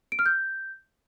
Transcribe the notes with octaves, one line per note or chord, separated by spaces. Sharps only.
D7
F6
G6